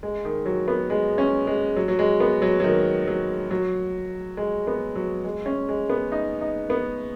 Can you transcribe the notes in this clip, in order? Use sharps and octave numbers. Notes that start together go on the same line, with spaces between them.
G#3
D#3
F#3
B3
G#3
C#4
G#3
F#3
F#3
G#3
B3
F#3
F#3
D#3
F#3
F#3
G#3
B3
F#3
G#3
C#4
G#3
B3
D#4
D#4
B3